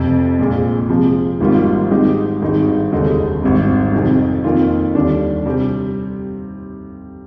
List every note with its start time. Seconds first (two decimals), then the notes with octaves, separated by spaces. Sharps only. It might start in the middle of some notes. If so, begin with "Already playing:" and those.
Already playing: F1 F2 C3
0.39 A#1 A#2 G#3
0.89 C3 F3 G#3 C4
1.40 G#1 G#2 G3 A#3 F4
1.91 G#2 D#3 G#3 D#4 G4
2.41 G#1 G2 D#3 G#3 D#4
2.92 F1 D#2 D3 G#3 D#4
3.43 G#1 G#2 G3 C4
3.93 F2 C3 D#3
4.44 F2 D#3 A#3 F4
4.95 D#2 D3 G3 D4
5.46 C3 G3 C4